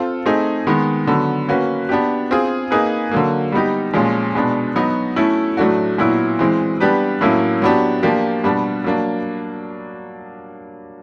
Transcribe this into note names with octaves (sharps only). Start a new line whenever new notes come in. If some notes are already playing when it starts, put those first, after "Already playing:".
Already playing: C4 F4 A4
A3 C4 D#4 G#4
D#3 G#3 B3
D3 F#3 B3
A#3 C#4 F#4 B4
B3 D4 G4
C4 F4 G#4
A#3 D#4 G#4 B4
D3 F#3 A#3
G3 B3 D#4 G4
A#2 F3 G#3 C#4
B2 G#3 B3 D4
F#3 B3 D#4 F#4
A3 C#4 E4 A4
A2 F#3 A3 D4 F#4
A#2 F#3 B3 E4
E3 G#3 C4
G3 B3 D4 G4 B4
A2 F#3 A#3 C#4 E4
F#3 B3 D4 G4
F3 A#3 D4 G4
B2 G3 B3 D4
F#3 A#3 D4